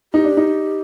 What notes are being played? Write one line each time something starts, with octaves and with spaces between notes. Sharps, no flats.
D#4 G4
D4
D#4